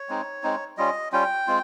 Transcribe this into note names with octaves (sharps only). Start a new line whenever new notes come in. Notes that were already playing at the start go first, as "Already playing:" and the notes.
Already playing: C#5
G#3 C4 D#4
G#3 C4 D#4
G3 C#4 F4 D#5
G3 C#4 F4 G5
G#3 C4 F4